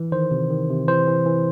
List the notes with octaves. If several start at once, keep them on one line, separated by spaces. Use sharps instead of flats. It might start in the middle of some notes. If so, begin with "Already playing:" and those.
Already playing: E3
D#3 C5
C3
D#3
C3
E3 C5
E3
E3